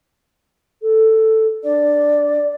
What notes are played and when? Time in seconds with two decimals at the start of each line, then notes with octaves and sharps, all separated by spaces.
0.81 A4
1.63 D4 D5